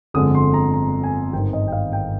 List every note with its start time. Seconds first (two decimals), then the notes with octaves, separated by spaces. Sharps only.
0.14 G1 F2 D3 G#3 D#6
0.35 C6
0.54 A#5
0.74 A#5
1.03 G#5
1.33 G#1 G2 D#3 G5
1.53 D#5
1.67 G5
1.72 F5
1.92 G5